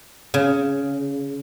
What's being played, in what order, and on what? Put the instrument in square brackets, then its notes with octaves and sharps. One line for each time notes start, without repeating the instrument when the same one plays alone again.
[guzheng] C#3